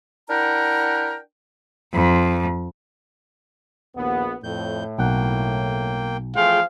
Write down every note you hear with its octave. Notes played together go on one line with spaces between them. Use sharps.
D4 E4 A#4 F#5 G5 A#5
F2
A#1 D#2 B3
F2 A2 G6
B1 A#3 F#5 G5
E2 F3 A3 F4 G#4 F5 G5